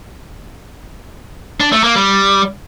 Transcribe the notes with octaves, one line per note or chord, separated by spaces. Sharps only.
D4
A3
A#3
G3